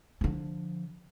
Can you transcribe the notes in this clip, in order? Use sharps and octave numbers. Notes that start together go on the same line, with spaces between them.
D3 F3